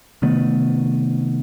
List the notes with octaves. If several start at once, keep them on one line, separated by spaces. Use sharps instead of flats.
C3 D#3 A3 B3